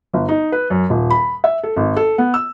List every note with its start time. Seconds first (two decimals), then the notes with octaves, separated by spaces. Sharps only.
0.14 G1
0.29 D#4
0.52 B4
0.70 F#2
0.90 D#1
1.10 B5
1.44 E5
1.63 A4
1.76 G#1
1.96 A4
2.18 B3
2.34 E6